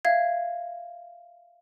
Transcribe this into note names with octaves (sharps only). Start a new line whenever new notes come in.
E5 F5 G#6